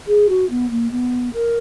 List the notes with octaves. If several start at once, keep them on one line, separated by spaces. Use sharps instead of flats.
G#4
F#4
B3
A#3
B3
A#4